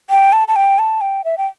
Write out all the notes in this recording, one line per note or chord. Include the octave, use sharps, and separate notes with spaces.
G5
A5
A5
G5
A5
G5
E5
G5